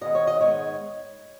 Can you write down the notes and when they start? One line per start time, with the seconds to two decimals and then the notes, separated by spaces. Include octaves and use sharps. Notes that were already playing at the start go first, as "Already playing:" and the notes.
0.01 G#2 D#3 G#3 B3 D#5
0.15 C#5
0.27 D#5
0.40 G#2 D#3 G#3 B3 C#5